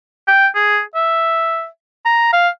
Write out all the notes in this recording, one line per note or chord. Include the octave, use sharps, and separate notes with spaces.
G5
G#4
E5
A#5
F5